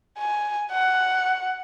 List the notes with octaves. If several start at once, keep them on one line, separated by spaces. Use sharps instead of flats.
G#5
F#5